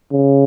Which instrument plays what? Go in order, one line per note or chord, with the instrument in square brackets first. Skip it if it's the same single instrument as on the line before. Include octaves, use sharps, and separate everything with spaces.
[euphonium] C#3